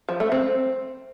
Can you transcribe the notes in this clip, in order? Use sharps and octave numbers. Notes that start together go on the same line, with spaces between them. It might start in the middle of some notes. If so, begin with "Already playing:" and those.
F3
A3
C4